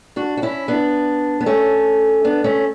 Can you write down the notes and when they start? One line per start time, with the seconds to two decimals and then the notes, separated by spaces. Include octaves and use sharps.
0.16 D4 F#4
0.37 F#4
0.42 C#4 E4
0.68 B3 D4
1.41 B3
1.46 A3 C#4
2.25 B3 D4
2.44 A3 C#4